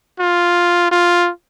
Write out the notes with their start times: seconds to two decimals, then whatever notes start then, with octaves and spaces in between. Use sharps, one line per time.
0.20 F4
0.92 F4